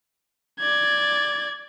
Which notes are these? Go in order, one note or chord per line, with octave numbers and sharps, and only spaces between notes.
D5 G#6